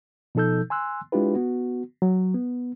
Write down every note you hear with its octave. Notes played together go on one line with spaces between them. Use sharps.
B2 F3 D#4 A4 E6 G6
G#5 C6 E6 F#6
G#3 D4 E4 F4 G4 B4
B3 F#4
F#3
B3